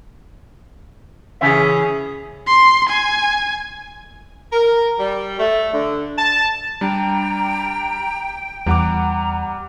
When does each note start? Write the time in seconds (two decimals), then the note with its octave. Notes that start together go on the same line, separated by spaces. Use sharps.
1.41 C#3 E3 C#4 G#4 E5
2.47 C6
2.89 G#5
4.53 A#4
5.00 G3
5.39 A3
5.74 D3
6.18 A5
6.81 G3 D4 G5 A#5
8.67 E2 G3 F#5 A#5 D6